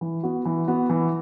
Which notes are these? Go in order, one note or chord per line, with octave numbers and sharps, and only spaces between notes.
E3
B3 F#4
E3
B3 F#4
E3